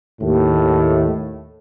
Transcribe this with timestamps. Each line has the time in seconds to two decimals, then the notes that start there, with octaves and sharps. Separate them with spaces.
0.22 D#2 A2